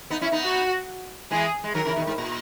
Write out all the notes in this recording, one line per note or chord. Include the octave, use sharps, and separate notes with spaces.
B3 D#4
C#4 E4
B3 D#4
F#4
E3 G#3 G#4
G#3
D#3 F#3 A#4
C#3 E3
B2 D#3
G#2
A#2